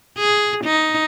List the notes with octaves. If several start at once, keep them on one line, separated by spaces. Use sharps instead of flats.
G#4
D#4